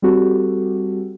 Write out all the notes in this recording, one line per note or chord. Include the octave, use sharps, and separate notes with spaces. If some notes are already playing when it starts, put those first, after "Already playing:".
G3 C4 F#4 G4 A4